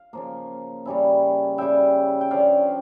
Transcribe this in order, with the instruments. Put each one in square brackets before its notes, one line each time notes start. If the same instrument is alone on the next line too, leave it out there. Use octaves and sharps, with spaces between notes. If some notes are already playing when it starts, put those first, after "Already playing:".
Already playing: [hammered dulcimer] F5
C#3 F3 A#3
C#3 G3 C#4 E4
C#3 G3 C#4 E4 E5 G5
G5
D3 F3 C#4 D5 F5